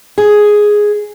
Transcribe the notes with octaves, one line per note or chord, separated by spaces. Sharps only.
G#4